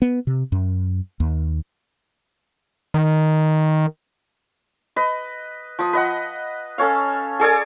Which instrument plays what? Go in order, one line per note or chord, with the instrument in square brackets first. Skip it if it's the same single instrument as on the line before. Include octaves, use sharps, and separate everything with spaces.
[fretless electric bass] B3
C3
F#2
D#2
[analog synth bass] D#3
[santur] B4 D#5
F3 D#6
B4 D#5 F#5
C#4 A4 C#5 F5
G#4 A4 D5 G#5